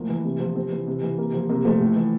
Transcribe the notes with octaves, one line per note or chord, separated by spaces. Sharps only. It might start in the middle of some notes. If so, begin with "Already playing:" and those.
Already playing: A2 F3 A#3
E3
C3
F3
C3 C4
E3
C3
E3
C3 A#3
F3
C3 A#3
F3 A3
A2
E3